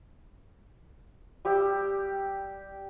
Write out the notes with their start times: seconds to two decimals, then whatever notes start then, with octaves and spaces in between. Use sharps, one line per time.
1.45 G3 G4 G5 E6